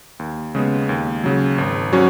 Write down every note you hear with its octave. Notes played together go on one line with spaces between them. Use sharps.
D#2
C#3 G#3 B3
D#2
C#3 F#3
G#1
F#3 C#4 F#4